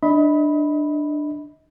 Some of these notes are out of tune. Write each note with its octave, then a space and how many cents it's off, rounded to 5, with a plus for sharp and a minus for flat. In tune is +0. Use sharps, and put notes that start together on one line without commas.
D4 +15 D#5 +35 B5 +0